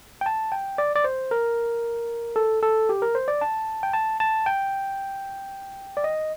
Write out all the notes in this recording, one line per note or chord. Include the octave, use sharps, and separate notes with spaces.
G5
A5
G5
D5
D5
C5
A#4
A4
A4
G4
A#4
C5
D5
A5
G5
A5
A5
G5
D5
D#5